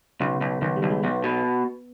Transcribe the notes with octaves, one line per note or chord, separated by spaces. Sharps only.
B1 C#3
B1
B1 D#3
G3
B1
G#3
B1 B3
B2